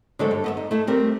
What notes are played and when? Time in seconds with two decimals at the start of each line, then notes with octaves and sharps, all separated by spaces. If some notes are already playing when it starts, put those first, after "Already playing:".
0.19 D3 F#3 G#3 A3 A4 C5
0.31 G2
0.44 B3 D#5 E5
0.57 D#4
0.71 A3 E4
0.87 G3 C4 G4 A#4